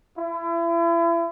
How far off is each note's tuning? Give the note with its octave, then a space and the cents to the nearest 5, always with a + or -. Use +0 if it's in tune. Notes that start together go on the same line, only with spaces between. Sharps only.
E4 +35